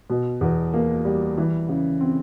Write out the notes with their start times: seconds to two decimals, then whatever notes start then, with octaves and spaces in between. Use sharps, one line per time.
0.10 B2
0.41 E2
0.74 A#3
1.05 G3
1.38 E3
1.69 C#3
2.00 C4